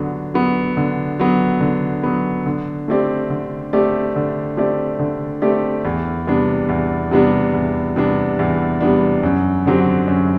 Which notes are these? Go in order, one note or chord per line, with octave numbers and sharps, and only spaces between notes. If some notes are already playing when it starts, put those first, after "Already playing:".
Already playing: D3 F#3 B3
F#3 B3
D3
F#3 B3
D3
F#3 B3
D3
A3 C4 G4 D5
D3
A3 C4 G4 D5
D3
A3 C4 G4 D5
D3
A3 C4 G4 D5
E2
C3 G3 B3 D4
E2
C3 G3 B3 D4
E2
C3 G3 B3 D4
E2
C3 G3 B3 D4
F#2
D3 F#3 C4 G4
F#2